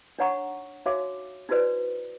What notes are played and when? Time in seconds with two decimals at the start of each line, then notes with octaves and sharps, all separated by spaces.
0.19 D4 D#4 C#5 F#5 A#5 C#6
0.86 D#4 F#4 C#5 E5 F5 D6
1.49 D#4 E4 F#4 B4 C5 D5